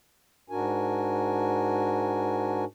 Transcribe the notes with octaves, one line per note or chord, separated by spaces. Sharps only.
G#2 D4 F#4 A#4 G#5